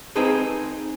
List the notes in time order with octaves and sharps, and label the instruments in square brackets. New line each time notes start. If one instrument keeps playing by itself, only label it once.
[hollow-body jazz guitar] C4 D#4 G#4 A4 B4 C5